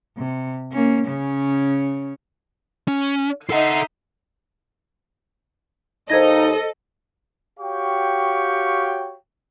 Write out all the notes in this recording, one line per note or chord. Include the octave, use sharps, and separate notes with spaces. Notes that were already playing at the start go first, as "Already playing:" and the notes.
C3
A#3 C#4
C#3 C#4
C#4
D#4 A4 E5 F#5 C7
D#2 D#4 A4 C5 D#5 G#6 A#6
F#4 G4 C#5 F5 G5 C#6